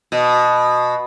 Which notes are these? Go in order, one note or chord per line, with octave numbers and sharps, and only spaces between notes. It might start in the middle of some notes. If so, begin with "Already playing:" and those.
B2